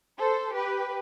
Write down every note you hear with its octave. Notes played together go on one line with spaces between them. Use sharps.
A4 C5
G4 B4